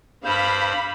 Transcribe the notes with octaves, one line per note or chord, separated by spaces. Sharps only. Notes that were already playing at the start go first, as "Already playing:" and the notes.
G2 C5 F5 B5